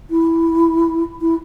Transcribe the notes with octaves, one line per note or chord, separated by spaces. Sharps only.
E4
E4